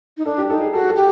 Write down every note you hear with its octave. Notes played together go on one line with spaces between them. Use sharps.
D#4
D4 A4
G4
D#4 A4
G#4
F#4 A4
A4
G4